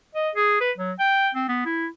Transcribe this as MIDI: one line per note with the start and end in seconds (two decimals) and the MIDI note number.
0.15 0.30 75
0.35 0.59 68
0.60 0.71 71
0.78 0.92 54
0.99 1.30 79
1.35 1.47 60
1.48 1.65 59
1.65 1.87 64